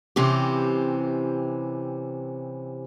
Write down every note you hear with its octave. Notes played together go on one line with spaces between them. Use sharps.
C3 E3 C4 C#4 G4